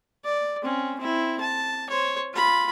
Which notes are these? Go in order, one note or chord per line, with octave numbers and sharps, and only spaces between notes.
D5
C4 C#4
C4 E4
A5
C5 C#5
F4 B5